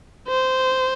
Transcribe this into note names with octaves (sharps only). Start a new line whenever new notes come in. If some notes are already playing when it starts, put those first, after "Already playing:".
C5